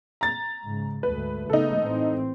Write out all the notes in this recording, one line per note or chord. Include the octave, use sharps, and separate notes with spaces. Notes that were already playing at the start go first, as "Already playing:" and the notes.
A#5 A6
G#2 C#3
D2 G#2 A3 B4
C#3 A3 B3 D#4 A4
A2 E3 C4